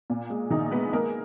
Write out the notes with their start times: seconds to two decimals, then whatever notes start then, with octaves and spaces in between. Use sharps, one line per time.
0.10 A#2
0.30 G#3
0.50 A#1 D#3 D#4
0.71 G#3 B3 B4
0.92 G#3 A#3 A#4